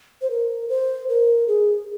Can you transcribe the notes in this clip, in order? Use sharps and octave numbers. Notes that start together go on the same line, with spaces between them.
C5
A#4
C5
A#4
G#4